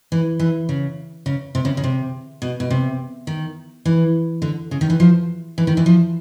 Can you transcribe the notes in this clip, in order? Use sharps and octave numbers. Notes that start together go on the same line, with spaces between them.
E3
E3
C#3
C#3
C3
C#3
C#3
C3
B2
B2
C3
D#3
E3
D3
C#3
D#3
E3
F3
E3
D#3
E3
F3